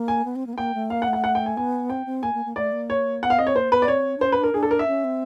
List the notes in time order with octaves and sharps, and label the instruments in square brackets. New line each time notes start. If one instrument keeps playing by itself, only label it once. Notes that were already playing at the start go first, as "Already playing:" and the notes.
Already playing: [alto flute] A#3
[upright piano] G#5
[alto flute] B3
C4
A#3
B3
[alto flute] A#3 [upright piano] G5
[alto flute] A3
[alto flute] A#3 [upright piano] F5
[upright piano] F#5
[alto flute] A3
[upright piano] F#5
F#5
G5
G#5
[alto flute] B3 [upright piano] G#5
[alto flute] C4 [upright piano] G5
[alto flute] C4
[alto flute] A#3 [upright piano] G#5
[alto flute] A#3
A#3
[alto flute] A3 [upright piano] D5
[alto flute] A#3
[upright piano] C#5
[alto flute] B3 [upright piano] F#5
[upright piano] F5
[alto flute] C4 [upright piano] D#5
[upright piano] C#5
[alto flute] A#3 [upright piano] C5
[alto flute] B3 [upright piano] B4
[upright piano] D5
[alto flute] C4 [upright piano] C#5
[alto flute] D4
[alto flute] C#4 [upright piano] C5
[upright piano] B4
[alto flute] D4
[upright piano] A#4
[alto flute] D4 [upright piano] G#4
[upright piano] A4
A#4
E5
[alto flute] C#4
C4